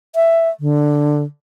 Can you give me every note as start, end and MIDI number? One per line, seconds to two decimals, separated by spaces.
0.15 0.49 76
0.60 1.23 50